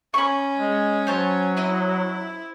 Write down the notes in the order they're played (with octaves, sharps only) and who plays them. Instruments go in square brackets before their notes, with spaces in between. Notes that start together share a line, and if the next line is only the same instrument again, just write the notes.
[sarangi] C#4 [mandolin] B5 C#6
[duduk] G#3
[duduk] F#3 [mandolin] C5 C#5 A5
[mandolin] C4 D#5 [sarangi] E4